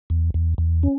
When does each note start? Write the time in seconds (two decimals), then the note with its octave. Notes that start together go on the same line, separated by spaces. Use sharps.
0.10 E2
0.34 E2
0.58 E2
0.83 C#4